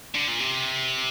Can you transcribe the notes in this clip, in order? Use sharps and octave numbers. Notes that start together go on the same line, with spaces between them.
D3
A#2
C3